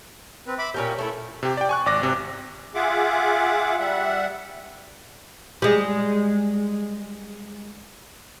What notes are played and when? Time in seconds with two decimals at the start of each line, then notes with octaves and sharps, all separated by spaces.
0.47 C4 B4
0.58 E5 B5 D6
0.74 A#2 C#4 G4 A#4
0.98 A3 E4 A4
1.43 C3 G4
1.57 D5 G5
1.69 G#5 C#6 F#6
1.86 G#1 D5 D6 A#6
2.02 G#1 C3
2.75 F4 G#4 E5 F#5 D6
3.78 G3 E5 F#5
5.62 G3 G#3